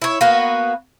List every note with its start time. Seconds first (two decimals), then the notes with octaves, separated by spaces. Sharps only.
0.02 E4 C#5
0.21 A#3 B3 F#4 B4